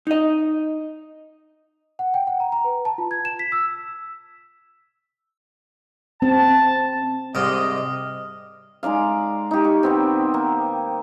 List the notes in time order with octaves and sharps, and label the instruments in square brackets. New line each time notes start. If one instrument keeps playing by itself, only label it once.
[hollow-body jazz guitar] D#4 D#5
[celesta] F#5
G5
F#5
A#5
A#5
B4
A5
F4
G#6
E7
B6
E6
[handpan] C4 [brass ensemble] A5
[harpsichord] C2 G#2 C3 [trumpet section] D#5 [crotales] D#6 F6
[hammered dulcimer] G#3 D#4 D5 F5
D#4 G4
C#6
D#3 B3 C4
A#3